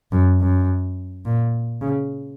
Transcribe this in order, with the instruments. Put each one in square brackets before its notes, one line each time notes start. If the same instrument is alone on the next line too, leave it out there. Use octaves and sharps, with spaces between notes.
[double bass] F#2
F#2
A#2
C#3